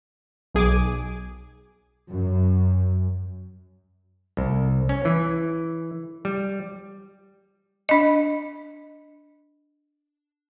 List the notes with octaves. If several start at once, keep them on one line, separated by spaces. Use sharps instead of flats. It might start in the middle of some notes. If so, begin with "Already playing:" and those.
B1 G#4 G#5 D6
F#2
C2
C#4
E3
G3
D4 D#5